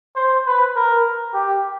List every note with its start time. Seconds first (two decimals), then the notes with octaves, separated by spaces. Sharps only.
0.16 C5
0.46 B4
0.76 A#4
1.34 G4